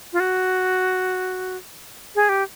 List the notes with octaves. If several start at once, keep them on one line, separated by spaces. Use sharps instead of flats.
F4
F#4
G#4
G4